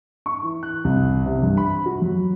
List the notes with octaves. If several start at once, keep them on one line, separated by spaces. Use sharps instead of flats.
C#6
E3
F#6
C2
C3
G2
B5
F#4
F#3